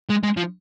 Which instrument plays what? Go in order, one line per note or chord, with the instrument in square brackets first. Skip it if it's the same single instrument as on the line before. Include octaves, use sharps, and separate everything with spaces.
[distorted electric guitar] G#3
G#3
F3